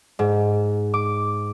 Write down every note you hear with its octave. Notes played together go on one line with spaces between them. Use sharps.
G#2
D6